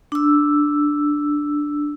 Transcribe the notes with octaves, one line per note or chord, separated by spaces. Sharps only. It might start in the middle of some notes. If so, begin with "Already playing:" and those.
D4 E6